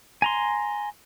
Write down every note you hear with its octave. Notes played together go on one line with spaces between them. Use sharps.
G#5 A#5 C6